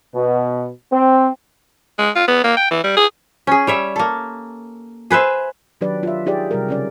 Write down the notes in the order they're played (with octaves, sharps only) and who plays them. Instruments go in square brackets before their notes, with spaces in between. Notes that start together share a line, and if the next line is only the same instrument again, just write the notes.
[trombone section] B2
C4
[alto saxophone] G#3
F4
B3
A#3
G5
E3
G3
G#4
[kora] C#4 G#4
G3 C#5 E5
A#3 A4
G#4 B4 C5 E5
[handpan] D#3 F#3 D4 G4 B4 D5
F4 E5
D#4 G4 G#4 D5
C3 G3 A#4
C#3 C#4 D5